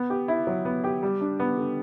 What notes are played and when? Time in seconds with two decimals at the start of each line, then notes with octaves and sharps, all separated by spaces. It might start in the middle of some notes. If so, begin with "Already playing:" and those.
Already playing: B3
0.10 G4
0.28 E4
0.47 F#3
0.65 B3
0.84 G4
1.03 G3
1.21 D4
1.40 B3
1.58 D3